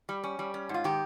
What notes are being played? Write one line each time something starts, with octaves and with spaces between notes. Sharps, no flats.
G3
C#4
G3
C#4
G#2
F4
D#3 G4